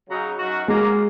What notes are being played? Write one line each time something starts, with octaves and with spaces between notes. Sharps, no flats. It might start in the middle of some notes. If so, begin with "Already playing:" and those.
C#3 F#3 D#4
F#2 F#3 D#4 F#4
F#3 G#3 A#3 C#4